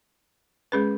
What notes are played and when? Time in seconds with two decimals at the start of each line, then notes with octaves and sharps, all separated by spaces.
0.72 G#3 C#4 G#4 B4